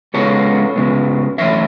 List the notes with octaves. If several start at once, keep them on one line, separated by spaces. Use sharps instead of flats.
C#2 C#3 G#3 B3 A4 C#5
C#2 C#3 G#3 B3
F#2 E3 A3 C#5 E5